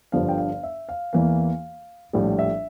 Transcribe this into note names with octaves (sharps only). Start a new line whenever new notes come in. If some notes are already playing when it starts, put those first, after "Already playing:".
G1 G2 D3 F3 F5
G5
F5
E5
F5
E2 E3 A#3 F5
A#1 A2 G3
E5